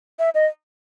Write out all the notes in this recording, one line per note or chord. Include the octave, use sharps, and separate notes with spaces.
E5
D#5